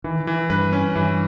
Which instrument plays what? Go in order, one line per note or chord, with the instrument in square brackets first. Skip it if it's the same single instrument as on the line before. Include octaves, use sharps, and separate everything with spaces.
[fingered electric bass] D#3 [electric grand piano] E3
[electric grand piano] E3
[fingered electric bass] G2 [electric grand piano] B4
[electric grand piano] C#4
[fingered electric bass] G2 [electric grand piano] E3